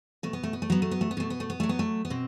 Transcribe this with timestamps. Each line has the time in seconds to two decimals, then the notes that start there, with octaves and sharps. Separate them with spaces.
0.23 B2 A3
0.33 B3
0.43 A3
0.53 B3
0.62 A3
0.70 F#3 B3
0.82 A3
0.91 B3
1.01 A3
1.11 B3
1.17 B2 A3
1.30 B3
1.40 A3
1.50 B3
1.60 F#3 A3
1.69 B3
1.79 A3
2.05 B3
2.10 B2 C4